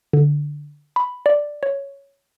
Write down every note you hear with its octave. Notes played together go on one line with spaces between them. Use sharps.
D3
B5
D5
C#5